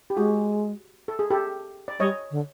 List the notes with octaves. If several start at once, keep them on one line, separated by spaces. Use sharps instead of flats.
G4
G#3 F#4 G#4
A4
G#4
G4 A4
D5
G3 C#5 D#5
D3